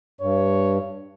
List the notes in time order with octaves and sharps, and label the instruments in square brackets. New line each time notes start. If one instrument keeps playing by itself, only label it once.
[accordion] G2 [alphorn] C#5